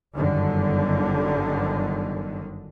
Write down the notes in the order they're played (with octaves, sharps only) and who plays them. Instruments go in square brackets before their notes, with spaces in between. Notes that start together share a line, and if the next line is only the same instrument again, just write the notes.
[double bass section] G1 F#2 D3 D#3